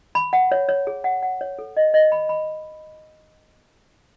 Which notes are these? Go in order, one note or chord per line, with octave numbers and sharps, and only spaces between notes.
B5
F#5
C#5
C#5
G#4
F#5
F#5
C#5
A4
D#5
D#5
B5
B5